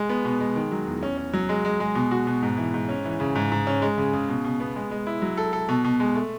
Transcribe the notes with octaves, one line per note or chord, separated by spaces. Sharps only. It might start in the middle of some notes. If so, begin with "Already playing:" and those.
Already playing: G#3
B3
B2
G#3
D#3
F#3
E2
C#4
C#4
F#3
G#3
G#3
G#3
B2
F#4
B2
G#2
E3
G#2
C#4
E3
C#3
G#2
G#2
C#4
G#3
C#3
C#3
B2
B2
B3
G#3
G#3
E4
F#3
A4
A4
B2
B2
G#3
A3